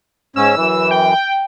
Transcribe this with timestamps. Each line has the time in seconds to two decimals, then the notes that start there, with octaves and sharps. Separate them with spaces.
0.36 G#2 C#4 E6
0.56 F#2 E3
0.91 G5